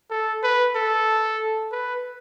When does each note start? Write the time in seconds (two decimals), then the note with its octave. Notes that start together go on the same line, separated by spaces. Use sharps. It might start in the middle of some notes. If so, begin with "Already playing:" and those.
0.10 A4
0.43 B4
0.75 A4
1.72 B4